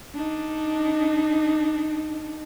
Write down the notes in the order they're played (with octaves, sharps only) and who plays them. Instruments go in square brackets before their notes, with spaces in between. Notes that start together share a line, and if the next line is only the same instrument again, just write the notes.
[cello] D4 D#4